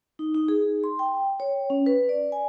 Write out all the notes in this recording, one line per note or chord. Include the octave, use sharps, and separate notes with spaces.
D#4
D#4
G#4
C6
G5
C#5
C#4
B4
D5
G#5